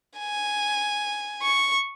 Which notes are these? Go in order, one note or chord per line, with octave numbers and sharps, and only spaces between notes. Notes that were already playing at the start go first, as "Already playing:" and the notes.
G#5
C#6